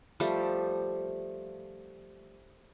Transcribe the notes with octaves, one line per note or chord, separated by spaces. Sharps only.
F3 G3 A3 G4